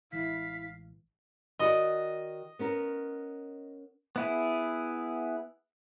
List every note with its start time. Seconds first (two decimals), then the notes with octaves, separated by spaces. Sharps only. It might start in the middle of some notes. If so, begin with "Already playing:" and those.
0.12 A1 E3 G#3 E4 F5 B6
1.59 D#3 F#4 D5 D#5
2.59 B3 C#4 A#4
4.16 B3 E4 G#4